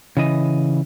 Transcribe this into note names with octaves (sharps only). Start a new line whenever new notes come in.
C#3 E3 D#5